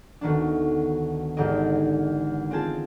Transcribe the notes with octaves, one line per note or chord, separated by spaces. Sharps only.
D2 B2 D#3 D4
G#1 E2 G#2 D3 G4 D#5
C4 F4 G#4 A5